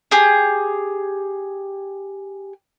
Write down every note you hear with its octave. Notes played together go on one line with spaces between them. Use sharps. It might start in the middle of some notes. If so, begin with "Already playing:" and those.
G4 G#4